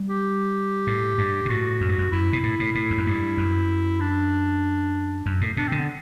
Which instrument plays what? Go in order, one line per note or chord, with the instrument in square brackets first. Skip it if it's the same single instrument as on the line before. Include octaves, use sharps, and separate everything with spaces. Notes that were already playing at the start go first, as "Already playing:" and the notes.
Already playing: [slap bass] G3
[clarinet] G4
[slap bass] A2
G2
B2
[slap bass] A2 [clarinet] F#4
[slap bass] F#2
G2
F#2
[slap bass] F#2 [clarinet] E4
[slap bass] B2
A2
A2
A2
E2
F#2
G2
F#2
[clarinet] D4
[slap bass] F#2
A2
[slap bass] B2 [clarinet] D4
[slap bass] D3 [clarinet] C4
[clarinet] B3